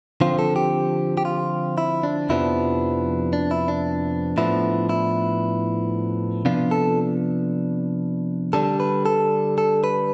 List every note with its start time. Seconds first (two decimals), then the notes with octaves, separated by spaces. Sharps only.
0.21 D3 F3 C4 F4
0.39 A4
0.56 G4
1.17 G4
1.25 F4
1.78 E4
2.03 D4
2.29 F2 C3 F3 B3 D4 E4
3.33 D4
3.51 E4
3.68 D4
4.37 A2 F3 B3 D4 E4
4.89 E4
6.45 C3 F3 B3 D4 F4
6.71 A4
8.53 D3 G3 D4 A4
8.80 B4
9.06 A4
9.58 A4
9.84 B4